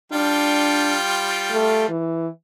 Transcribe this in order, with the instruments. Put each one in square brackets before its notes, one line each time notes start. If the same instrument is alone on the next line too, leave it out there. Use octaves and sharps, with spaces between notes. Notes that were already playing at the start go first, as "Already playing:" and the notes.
[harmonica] G3 F4 G5 [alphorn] D4
[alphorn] A3
E3